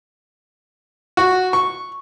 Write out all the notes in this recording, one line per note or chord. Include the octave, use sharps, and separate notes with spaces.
F#4
C#6